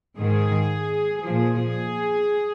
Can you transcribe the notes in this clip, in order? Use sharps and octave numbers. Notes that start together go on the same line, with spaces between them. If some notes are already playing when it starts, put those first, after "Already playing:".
G#2 D#3 G#4
A#2 F3 G#4